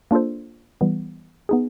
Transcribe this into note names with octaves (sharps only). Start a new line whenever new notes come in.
A#3 D4 F4 A4 C5
E3 G3 B3
B3 D#4 G#4